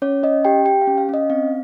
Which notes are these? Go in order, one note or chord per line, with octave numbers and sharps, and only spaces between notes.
C#4 C#5
C#4 D#5
G4 G5
G4 G5
F5
C#4
F5
C#4 D#5
C4 F5